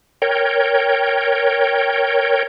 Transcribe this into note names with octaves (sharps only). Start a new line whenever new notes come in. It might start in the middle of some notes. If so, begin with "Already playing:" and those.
A#4 C#5 G5